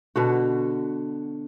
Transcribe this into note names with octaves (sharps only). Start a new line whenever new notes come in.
B2 D3 F#4